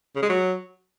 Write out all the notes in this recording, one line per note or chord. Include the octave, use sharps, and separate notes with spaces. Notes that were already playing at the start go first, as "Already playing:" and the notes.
C#3
G#3
F#3